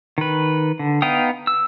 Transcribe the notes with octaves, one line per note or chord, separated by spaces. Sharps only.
D#3 B4
D3
B3 D#4 F5 G5 D#6
E6